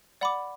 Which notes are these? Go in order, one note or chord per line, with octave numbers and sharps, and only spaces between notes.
D5 F#5 B5 D6